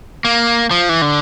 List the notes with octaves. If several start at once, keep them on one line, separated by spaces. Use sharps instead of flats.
A#3
F3
E3
D3